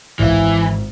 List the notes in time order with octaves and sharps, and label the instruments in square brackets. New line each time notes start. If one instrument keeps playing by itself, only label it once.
[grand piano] G#1 E4 F5 [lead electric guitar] E3